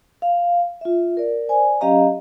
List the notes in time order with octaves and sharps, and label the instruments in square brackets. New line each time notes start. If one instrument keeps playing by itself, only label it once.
[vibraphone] F5
F4 E5
A#4 D5
C5 D5 G#5
F#3 C#4 G4 D#5 F5 A#5